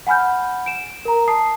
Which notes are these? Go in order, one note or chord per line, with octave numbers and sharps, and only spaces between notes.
F#5 G#5 B5 F6 G6
D7 E7
A#4 A#5
A5 D#6 C7